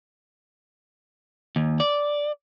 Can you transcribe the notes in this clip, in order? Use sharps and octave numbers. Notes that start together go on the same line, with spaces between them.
D#2
D5